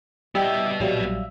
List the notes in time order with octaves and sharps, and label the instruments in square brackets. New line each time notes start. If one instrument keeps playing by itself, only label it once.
[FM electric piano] G3 [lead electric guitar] B3 D#5 [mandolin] E4 G4
[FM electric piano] A#1 F#3 G3 [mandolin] E5 F5